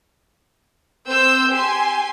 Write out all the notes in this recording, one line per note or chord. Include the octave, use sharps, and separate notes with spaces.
C4 C5 E6 G6
G4 G#5 C6